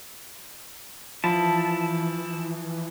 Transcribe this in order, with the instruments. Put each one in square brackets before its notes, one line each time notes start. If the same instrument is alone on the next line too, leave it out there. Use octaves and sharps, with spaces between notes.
[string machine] E3 [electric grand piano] F3 [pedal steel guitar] E4 A5